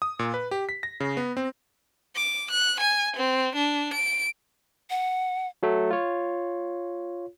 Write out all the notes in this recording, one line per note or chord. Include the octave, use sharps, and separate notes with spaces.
D#6
A#2
B4
G4
B6
A#6
C#3
B3
C4
D6
F#6
G#5
C4
D4
D7
F#5
F#3 A3
F4 C#5